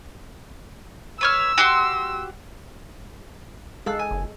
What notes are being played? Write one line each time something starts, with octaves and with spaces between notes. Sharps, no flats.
B4 C#5 E6 F6
F#4 G4 C6
G#3 A4 F5 E6 F#6
G#5
F#1